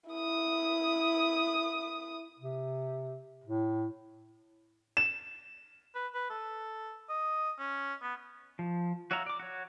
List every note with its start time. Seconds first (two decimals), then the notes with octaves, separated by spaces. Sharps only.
0.10 E4 D#6
2.39 C3
3.44 A2
4.97 E7
5.95 B4
6.14 B4
6.30 A4
7.10 D#5
7.59 C#4
8.02 B3
8.59 F3
9.11 F#4 C#5 E5 F5 A#5
9.26 D5 D6
9.40 F#4 C#5